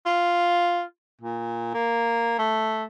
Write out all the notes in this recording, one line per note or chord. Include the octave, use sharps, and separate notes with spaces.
F4
A#2
A#3
A3